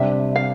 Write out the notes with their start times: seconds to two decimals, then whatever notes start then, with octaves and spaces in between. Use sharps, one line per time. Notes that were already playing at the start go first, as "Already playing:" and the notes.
Already playing: C3 G3 D4 G4 E5
0.35 F5